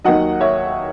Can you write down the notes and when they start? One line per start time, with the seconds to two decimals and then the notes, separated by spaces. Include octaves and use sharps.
0.04 D#2 D#3 F#3 D#5 F#5
0.41 C#5 E5